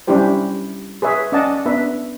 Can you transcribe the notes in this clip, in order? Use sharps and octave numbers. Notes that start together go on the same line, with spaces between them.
G3 C#4 D4 E4 G4 C5
G#4 B4 C#5 E5
C#4 D5 D#5 F#5 A5
B3 D4 B4 E5